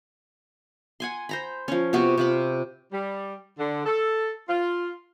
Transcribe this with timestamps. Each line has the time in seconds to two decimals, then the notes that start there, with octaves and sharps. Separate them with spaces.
1.00 F#5 G#5 C6
1.29 C5 A#5 B5
1.68 F3 C#4
1.93 C3 B3 F#4 B4
2.18 C3 F4 B5
2.92 G3
3.58 D3
3.86 A4
4.48 F4